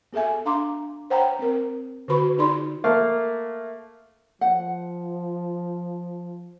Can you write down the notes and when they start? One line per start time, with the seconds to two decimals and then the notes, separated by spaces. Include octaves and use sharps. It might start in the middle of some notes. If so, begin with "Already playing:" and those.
0.13 B3 G#4 A4 E5 G#5
0.45 D4 F5 A#5 C6 D6
1.10 C5 C#5 F#5 G5 A#5 B5
1.39 C4 A#4
2.08 D3 F4 F#4 B4 B5 C#6
2.38 D#4 F4 G#4 D5 B5 C6
2.84 A3 A#3 F5
4.41 F3 F#5